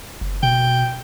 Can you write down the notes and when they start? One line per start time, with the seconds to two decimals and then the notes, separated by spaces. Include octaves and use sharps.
0.21 F#1
0.43 B2 G5